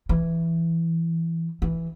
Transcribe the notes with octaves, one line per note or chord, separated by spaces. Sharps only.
E3
E3